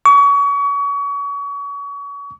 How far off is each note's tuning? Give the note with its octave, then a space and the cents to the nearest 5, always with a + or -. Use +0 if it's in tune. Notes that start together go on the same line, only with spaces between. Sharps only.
C#6 +35